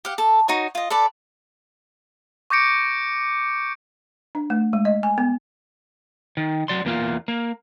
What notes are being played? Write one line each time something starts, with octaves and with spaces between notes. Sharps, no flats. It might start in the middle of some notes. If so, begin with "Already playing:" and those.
G4 F5 F#5
A4
D#4 F#4 C#5
F4 D#5
A4 B4 D5 A5
C#6 D6 G6 A#6 C#7 D7
D4
A3
G#3
D#5
G#5
B3
D#3
F#3 D5 C6
E2 A#3 F4
A#3